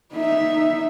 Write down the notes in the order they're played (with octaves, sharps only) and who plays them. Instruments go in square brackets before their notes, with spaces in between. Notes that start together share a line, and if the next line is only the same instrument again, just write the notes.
[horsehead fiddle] D#4 E5